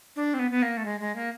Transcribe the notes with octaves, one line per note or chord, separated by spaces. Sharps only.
D4
C4
B3
B3
A#3
A3
G#3
G#3
A#3